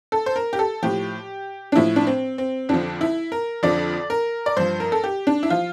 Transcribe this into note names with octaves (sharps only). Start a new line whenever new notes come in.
A4
C5
A#4
G4
A4
A2 F3 G4
D4
A2 F3 E4
D4
C4
C4
F2 D3 F3 D4
E4
A#4
F2 D3 F3 D5
A#4
D5
G2 F3 C5
A#4
A4
G4
D4
E4
F3 F4